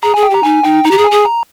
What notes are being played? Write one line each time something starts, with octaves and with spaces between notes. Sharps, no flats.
G#4 A#5
G#4 G#5
G5
G4 A#5
D#4 G#5
D#4 G5
D#4 A#5
G4
G#4
G#5
G#4
A#5